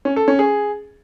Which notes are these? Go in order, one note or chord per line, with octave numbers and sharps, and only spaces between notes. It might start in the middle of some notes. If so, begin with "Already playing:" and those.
C#4
A4
C#4
G#4